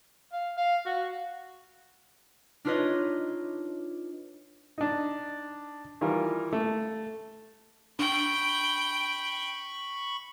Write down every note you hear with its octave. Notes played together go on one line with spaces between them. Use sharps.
F5
F5
F#4
D4 D#4 F4 B4 C#5 D#5
D4 D#4
D#3 E3 G3 F4 A#4
A3
D4 G5 B5 C#6